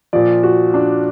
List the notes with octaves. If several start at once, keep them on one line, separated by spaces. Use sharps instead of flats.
A#2 F3 D5
F#4
D4